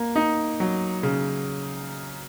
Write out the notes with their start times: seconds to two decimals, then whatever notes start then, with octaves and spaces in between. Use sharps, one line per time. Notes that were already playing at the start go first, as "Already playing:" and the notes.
Already playing: A#3
0.16 D#4
0.60 F#3
1.03 C#3